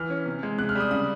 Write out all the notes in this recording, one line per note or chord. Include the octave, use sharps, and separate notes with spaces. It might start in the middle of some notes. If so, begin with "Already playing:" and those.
Already playing: E3 F6
C#4
C3
G#3
C3 F#6
F6
G3
D#6
C#3 D#6